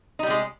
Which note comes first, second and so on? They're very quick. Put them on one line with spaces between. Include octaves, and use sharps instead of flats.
D#4 G3 C3 G#3